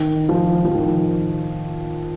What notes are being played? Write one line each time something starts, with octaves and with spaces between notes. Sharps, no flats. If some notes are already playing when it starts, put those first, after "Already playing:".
Already playing: D#3
F3
F3
D#3